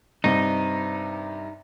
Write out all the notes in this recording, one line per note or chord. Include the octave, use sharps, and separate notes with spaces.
G2 C3 D#4